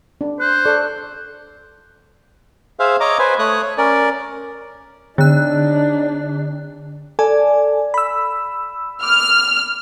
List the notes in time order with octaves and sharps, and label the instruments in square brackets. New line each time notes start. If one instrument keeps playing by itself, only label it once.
[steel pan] D4
[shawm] C5 [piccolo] F#6
[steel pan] A4 D5 C#6
[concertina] G#4 C5 E5 F5
C#5 D#5 A#5 D6
B4 C5 G#5
A3 C#5 D#6 F#6
C#5
C#4 A#4 D5
[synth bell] D3 F#6 [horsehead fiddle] D4 D#4
[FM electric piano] A4 G#5 [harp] D5
[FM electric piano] B5 E6
[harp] D6 G6 [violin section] F6